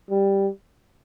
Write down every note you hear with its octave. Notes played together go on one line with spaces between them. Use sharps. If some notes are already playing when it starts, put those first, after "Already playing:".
G3